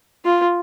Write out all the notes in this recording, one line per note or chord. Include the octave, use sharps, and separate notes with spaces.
F4